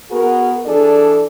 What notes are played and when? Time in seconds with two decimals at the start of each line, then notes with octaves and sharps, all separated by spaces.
0.11 B3 F#4 G#4 A#4
0.66 E3 D4 G#4 A4 D5